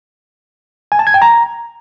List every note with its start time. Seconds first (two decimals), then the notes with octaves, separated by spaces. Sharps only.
0.92 G#5
0.99 A5
1.07 G#6
1.14 G5
1.22 A#5